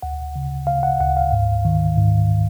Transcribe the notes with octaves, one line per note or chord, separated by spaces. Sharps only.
D2 F#5
C#3
C#3 F5
F#5
D2 F#5
F5
G#2
D#3
G#2